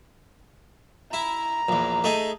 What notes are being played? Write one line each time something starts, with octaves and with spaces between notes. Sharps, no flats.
E4 A#5
A#1 E2
A3 D#4 G#4